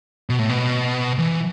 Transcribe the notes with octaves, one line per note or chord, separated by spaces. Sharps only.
B2
A2
B2
E3